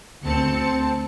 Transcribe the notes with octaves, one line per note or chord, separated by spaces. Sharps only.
D2 C4 A4 A5 C#7